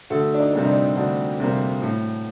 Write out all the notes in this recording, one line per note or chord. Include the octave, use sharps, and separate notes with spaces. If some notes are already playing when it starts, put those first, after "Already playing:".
D2 A4
D4
D#4
C3 G3 A#3
D#4
D4
D2 D4
C3 G3 A#3
A2